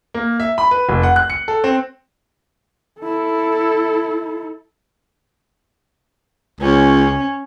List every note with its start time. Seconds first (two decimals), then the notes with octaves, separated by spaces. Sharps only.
0.14 A#3
0.40 E5
0.58 B5
0.71 B4
0.89 F1
1.03 F#5
1.16 F#6
1.30 C#7
1.48 A4
1.64 C4
3.00 E4 A4
6.60 C#2 C#4